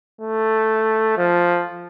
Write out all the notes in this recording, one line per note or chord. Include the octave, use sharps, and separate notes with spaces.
A3
F3